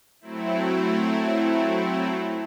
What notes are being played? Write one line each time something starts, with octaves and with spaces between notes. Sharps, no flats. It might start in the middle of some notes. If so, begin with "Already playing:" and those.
F#3 A3 C4 E4